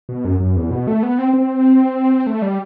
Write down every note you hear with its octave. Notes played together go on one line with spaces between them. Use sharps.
B2
F#2
F#2
E2
B2
A3
B3
C4
C4
A3
G3